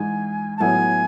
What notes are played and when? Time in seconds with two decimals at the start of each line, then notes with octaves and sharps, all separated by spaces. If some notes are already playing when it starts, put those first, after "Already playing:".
Already playing: G#2 E3 G#3 D#4 G#5
0.57 A5
0.60 A2 F#3 B3 E4 G#5